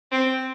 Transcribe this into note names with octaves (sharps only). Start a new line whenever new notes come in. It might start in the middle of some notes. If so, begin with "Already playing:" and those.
C4